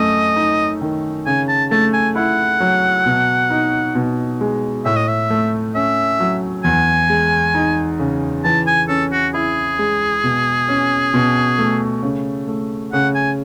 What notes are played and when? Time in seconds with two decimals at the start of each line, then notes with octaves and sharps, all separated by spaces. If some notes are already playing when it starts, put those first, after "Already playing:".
Already playing: F#2 A3 D#5
0.36 D#4
0.81 D#3
1.26 C#3 G#5
1.49 A5
1.71 A3 A5
1.93 G#5
2.15 E4 F#5
2.60 F#3
3.06 B2
3.50 D#4
3.95 B2
4.41 G#3
4.85 A2 E5
4.96 D#5
5.08 E5
5.30 A3
5.75 C#4 E5
6.20 F#3
6.64 E2 G#5
7.10 G#3
7.55 D#4
7.99 C#3
8.44 E3 A5
8.67 G#5
8.89 C#4 A4
9.12 F#4
9.34 E4 G#4
9.79 G#3
10.23 B2
10.68 C#4
11.14 B2
11.59 A3
12.03 C#3
12.48 A3
12.93 C#3 F#5
13.15 G#5